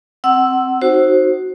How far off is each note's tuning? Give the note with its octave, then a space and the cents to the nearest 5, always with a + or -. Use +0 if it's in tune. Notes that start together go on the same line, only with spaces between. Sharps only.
C4 +10 F#5 +20 E6 +0
D#4 +0 F#4 +0 C5 +15